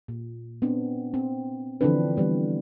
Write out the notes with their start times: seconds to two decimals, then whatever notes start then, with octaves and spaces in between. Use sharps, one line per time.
0.08 A#2
0.62 B3 C4 D4
1.14 C4
1.81 D3 E3 F3 C4 D4 B4
2.17 E3 G3 B3